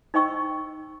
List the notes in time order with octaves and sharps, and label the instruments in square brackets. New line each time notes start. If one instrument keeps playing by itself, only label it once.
[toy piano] D#4 C5 D#5 G5 C#6 E6